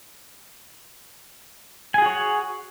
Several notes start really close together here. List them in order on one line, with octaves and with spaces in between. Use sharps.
G#5 G#4 F#4 C#5 F#5